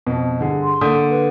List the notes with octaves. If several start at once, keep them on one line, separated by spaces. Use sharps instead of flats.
F2 B2
G2 D3 G#4
C6
D3 A#3 D#6 G6 B6
B4